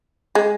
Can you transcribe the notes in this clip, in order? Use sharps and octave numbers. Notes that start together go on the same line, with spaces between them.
G#3